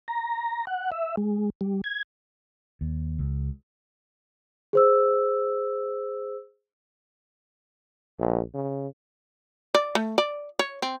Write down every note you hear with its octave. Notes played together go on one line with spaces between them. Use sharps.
A#5
F#5
E5
G#3
G3
G#6
D#2
C#2
G#4 C5 E6
A#1
C#3
D5
A3
D5
C#5
C4